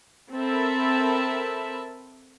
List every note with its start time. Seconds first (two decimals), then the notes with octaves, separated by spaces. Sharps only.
0.33 C4 A4 A#4 E5 A5 B5